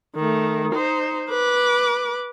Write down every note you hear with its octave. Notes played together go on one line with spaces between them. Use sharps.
D#3 A3
D#4 C5
B4 D6